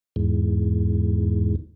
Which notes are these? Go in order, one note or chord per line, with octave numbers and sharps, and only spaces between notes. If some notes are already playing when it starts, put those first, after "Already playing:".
E2 G#2